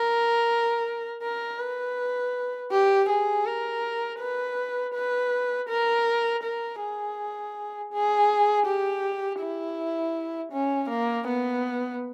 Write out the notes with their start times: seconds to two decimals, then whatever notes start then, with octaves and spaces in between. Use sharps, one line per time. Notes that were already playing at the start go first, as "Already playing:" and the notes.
Already playing: A#4
1.23 A#4
1.59 B4
2.72 G4
3.09 G#4
3.46 A#4
4.20 B4
4.94 B4
5.69 A#4
6.43 A#4
6.81 G#4
7.93 G#4
8.66 G4
9.41 E4
10.52 C#4
10.89 A#3
11.27 B3